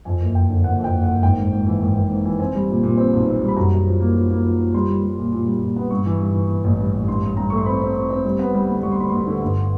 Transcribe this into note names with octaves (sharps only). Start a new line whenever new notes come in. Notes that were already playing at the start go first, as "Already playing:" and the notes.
F2 G#5
F#1
F#1 G5
D3
F#1 F#5
F2
G5
F#1
F#1 F#5
G#1 G5
G#2
G#2
E3
G#1
G#1
G#2
E3
C4 G#5
G3
A#2
A#2
C4
B1
C4
G3
B5
F#2 A#5
F#2
F3
A#3
F3
A#3
F3
F3
G3 C6
G3
G3
A#2
A#2
G3
A#2
B3
G2 C#6
E3
G2
E3
E3
A1
G2
A1
G2 C6
G2
G2 A#5
A3 C#6
C6
C4 B5
C4
C4
C4
G3
B3
G3
D2
G3 C#6
C6
D2 B5
D2 C6
D3
G1